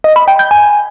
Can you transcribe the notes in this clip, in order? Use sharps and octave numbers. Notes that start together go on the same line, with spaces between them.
D#5
B5
G5
G6
G#5